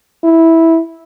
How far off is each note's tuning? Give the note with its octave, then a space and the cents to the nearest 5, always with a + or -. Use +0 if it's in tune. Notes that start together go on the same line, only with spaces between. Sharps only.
E4 -10